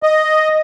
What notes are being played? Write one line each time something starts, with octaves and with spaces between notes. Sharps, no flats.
D#5